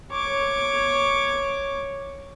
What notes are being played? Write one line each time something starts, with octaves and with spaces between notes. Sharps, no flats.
C#5 D6